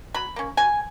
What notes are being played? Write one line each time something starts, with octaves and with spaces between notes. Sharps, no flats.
F#3 B5
A#3 C#4
F#3 G#5